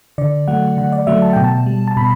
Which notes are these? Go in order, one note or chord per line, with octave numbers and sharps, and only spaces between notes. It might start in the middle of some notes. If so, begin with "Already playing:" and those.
D3 D5
F#3 A3 F#5
D3 F#5
D5
F#3 A3 E5
A5
B2 G5
A5
G3
A5
B2 B5